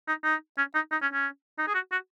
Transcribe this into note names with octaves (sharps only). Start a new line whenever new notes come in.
D#4
D#4
C#4
D#4
D#4
C#4
C#4
D#4
G#4
F#4
F#4